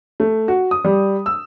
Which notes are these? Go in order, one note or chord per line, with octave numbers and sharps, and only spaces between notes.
A3
F#4
D#6
G3
E6